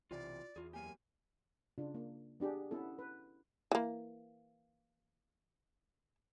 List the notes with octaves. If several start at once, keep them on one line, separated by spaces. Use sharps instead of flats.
B1 C3 E3 F4 D5
E2 F4 G#4
F#2 A#3 G4 G#5
C#3 D4 F4
A#3
B3 D4 G4 G#4
B3 C#4 E4 A4
B4
E3 A#3